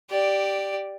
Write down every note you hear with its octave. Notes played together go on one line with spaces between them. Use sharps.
G4 D5